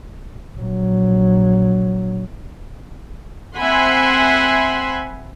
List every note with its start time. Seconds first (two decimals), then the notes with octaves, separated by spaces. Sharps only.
0.56 A#1 F#3
3.56 C4 E5 F#5 G#5 B5 C6